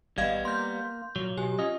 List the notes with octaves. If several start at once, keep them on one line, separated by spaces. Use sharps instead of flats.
G#1 G3 B3 D#5 F5 G#6
A#3 C6 G6
A#2 F#3
B2 G4 G#5
C#4 F4 D#5